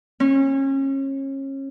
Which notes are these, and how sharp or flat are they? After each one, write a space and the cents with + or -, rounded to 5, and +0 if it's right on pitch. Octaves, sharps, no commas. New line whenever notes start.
C#4 -30